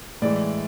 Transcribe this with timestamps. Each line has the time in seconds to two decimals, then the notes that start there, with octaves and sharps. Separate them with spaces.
0.22 A2 E3 G#3 D5